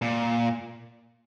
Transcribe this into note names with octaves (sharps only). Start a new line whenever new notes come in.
A#2